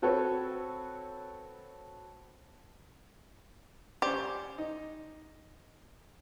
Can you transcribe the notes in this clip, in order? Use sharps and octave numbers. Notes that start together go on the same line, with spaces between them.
C4 F#4 A4 B4 C#5
C#4 G4 C5 D5
D#4